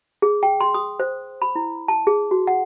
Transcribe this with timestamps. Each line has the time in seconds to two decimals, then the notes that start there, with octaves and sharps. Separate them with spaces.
0.22 G#4
0.43 G5
0.61 C6
0.74 D#6
1.00 C5
1.42 B5
1.56 E4
1.88 A5
2.07 G#4
2.31 F#4
2.47 F#5